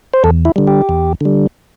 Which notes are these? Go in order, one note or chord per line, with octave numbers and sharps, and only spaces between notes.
C5
E2 A4
E4
D3 G3
G4
E2
D3 G3